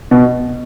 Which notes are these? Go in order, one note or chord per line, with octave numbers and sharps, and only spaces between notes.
B2